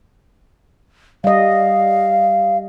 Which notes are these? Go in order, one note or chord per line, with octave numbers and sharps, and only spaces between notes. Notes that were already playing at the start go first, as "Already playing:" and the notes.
G3 D#5 F5